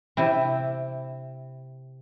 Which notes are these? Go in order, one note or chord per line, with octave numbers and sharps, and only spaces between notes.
C3 E4